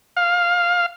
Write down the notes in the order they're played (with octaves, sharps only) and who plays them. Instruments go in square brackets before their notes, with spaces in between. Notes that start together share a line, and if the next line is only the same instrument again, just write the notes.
[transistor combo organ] F5